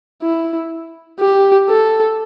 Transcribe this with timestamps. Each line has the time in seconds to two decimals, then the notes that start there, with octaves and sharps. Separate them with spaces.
0.22 E4
1.20 G4
1.68 A4